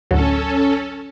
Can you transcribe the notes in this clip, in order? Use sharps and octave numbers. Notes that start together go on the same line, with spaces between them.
A1 D2 F#3 C#4 A4